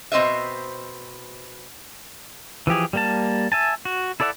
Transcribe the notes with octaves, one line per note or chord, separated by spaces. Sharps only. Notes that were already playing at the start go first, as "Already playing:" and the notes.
B2 C4 C5 D#5 E5
E3 F3 G4 G#4
G3 A#3 A5
E5 G#5 A5
F#4
E4 A4 D5 E5 F#5